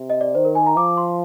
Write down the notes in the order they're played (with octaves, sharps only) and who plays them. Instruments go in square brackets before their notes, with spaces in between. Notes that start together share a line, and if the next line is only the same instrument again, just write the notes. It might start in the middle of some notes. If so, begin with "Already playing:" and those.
Already playing: [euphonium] C3
[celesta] D#5
D5
[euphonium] D#3 [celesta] C5
[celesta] A#4
G#5
A#5
[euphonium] F3 [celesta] D6
[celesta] C6